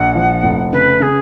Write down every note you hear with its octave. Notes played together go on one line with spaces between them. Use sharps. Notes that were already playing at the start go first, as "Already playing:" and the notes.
Already playing: A#1 F#5
F3
F1
C#3 B4
C#3 G#4